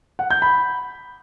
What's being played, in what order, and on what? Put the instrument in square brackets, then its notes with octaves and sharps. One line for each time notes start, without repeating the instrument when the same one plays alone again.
[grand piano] F#5
G6
B5